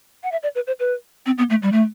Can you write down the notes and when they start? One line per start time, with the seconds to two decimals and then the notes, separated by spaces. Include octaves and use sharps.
0.23 F#5
0.32 E5
0.43 D5
0.55 B4
0.67 C5
0.79 B4
1.26 C4
1.38 B3
1.50 A3
1.62 G3
1.72 A3